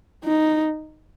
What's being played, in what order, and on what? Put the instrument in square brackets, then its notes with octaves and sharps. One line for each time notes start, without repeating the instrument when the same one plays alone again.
[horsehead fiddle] D#4